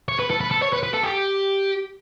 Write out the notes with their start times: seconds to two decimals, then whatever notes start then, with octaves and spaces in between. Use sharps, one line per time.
0.09 C#5
0.19 B4
0.30 A4
0.41 B4
0.51 A4
0.62 C#5
0.73 B4
0.83 B4
0.94 A4
1.04 G4